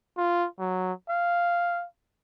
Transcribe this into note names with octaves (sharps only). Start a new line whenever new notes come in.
F4
F#3
F5